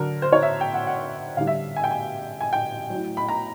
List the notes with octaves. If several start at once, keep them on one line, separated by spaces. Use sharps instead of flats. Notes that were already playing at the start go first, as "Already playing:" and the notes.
Already playing: D3 F#3 A#4
C5
C#5
E5
G5
F#5
F#5
D3 G3 F5
E5
G#5
G5
G#5
G#5
G5
F#3
A2
B5
A#5